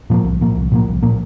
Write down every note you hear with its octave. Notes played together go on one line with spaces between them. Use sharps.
A#2 F3 A#3
C2
A#2 F3 A#3
C2
A#2 F3 A#3
C2
A#2 F3 A#3